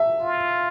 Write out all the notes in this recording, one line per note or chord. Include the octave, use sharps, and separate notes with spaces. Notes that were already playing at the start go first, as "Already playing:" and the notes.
Already playing: E5
F4